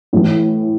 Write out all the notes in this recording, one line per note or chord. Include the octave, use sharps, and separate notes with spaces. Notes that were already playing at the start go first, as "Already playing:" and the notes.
A2 E3